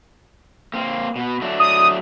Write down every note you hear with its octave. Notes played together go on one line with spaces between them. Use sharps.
A#3 C4
B2 B3
F#3 A3 D4
D#6